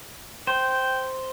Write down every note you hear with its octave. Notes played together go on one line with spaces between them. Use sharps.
C5 G5